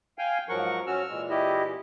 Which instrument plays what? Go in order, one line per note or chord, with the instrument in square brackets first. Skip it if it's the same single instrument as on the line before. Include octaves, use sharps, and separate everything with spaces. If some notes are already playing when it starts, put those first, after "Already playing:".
[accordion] F5 G#5 [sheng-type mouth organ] G5
[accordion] G#2 F3 F#3 [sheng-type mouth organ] A#4 F#5 C#6
[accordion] C#4 F#4 [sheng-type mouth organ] E6 F6
[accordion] A#2 E3 G#3
[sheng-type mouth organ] E4 G4 D#5